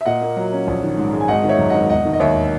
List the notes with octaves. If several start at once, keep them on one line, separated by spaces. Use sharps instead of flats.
E5
A#2 D#5 F#5
A#3
F#3
C#4
A#1
D#3
G#2
G#3
G#5
G#1 D#5 F#5
D#3
C#5 E5
F#2
G#1 D#5 F#5
E1 D#5 F#5
D#3
D#5
D#2 C#5 E5